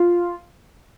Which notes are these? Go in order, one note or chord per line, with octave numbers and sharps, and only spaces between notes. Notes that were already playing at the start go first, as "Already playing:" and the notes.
Already playing: F4